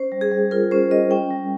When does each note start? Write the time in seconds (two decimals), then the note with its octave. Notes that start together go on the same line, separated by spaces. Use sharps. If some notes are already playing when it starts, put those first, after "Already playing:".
Already playing: C#4 C5
0.12 G3
0.21 G#4
0.32 G3
0.51 F4 A#4
0.71 C#4 C5
0.91 G3 D#5
1.11 C#4 G5
1.31 G3